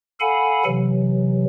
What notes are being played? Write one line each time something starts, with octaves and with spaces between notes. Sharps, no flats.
A4 F5 F#5 G#5 B5
C3 E3 F#3